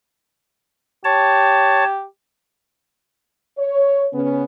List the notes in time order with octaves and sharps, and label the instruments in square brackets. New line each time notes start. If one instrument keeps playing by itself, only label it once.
[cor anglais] G4 [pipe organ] C#5 A5
[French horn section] C#5
C#3 B3 C#4